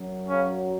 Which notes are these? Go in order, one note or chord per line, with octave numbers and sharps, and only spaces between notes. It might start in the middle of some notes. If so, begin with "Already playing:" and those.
Already playing: F#2 F#3
C#3 C#4